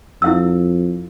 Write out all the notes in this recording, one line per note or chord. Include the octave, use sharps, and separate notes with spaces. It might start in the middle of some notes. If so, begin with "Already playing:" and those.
F2 E4 F5 E6